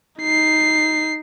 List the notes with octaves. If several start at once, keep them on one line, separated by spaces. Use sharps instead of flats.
D#4 C7